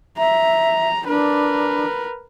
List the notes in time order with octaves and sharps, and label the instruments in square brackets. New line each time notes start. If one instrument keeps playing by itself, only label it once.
[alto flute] E5 [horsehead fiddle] A#5
[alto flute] D4 [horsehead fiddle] A#4 B4